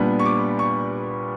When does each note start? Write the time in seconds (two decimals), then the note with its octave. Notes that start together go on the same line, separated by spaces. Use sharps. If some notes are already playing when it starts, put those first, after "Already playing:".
Already playing: A#2 G3 B3 D4
0.19 C#6
0.26 D6
0.59 C#6